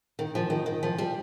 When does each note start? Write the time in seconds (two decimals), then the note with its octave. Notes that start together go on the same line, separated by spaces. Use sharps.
0.19 D#3
0.35 F3
0.50 D#3
0.66 D#3
0.83 F3
0.98 G3